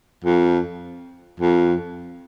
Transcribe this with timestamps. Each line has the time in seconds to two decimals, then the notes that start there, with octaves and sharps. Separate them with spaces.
0.24 F2
1.40 F2